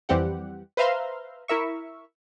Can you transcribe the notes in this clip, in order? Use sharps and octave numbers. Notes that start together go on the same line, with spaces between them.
F2 E3 G3 C4 G4 F#5
B4 C5 E5 F5 A#5 C6
E4 A#4 E5 C#6